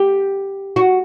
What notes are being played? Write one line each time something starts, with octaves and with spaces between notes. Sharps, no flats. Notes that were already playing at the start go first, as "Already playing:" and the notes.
Already playing: G4
F#4